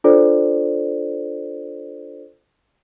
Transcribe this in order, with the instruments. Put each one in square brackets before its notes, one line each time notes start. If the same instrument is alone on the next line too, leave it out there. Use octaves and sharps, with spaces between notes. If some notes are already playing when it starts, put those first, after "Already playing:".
[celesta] D4 F4 A4 C5 D5